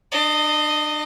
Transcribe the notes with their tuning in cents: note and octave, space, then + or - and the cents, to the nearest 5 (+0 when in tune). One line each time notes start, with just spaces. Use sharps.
D4 +40 D#5 +0